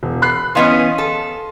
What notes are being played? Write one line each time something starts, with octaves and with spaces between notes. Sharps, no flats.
E1
B5 F#6 C7
E3 B3 C#4 D#5 F5 C6
A4